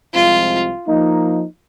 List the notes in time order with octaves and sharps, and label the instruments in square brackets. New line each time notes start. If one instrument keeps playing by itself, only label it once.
[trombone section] C2 C3 F3 G#3 C4 [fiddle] F4
[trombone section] F3 A#3 D#4